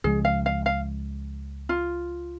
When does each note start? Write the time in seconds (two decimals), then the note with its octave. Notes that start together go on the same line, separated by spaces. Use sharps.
0.04 C#2 C#3 F3 G#3 G#4
0.25 F5
0.46 F5
0.66 F5
1.69 F4